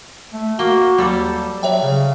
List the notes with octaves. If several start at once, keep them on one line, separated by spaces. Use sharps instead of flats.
A3
A#3 F#4 G7
D#2 F#3 G3 A4
F#3 C#5 E5 G5
C#3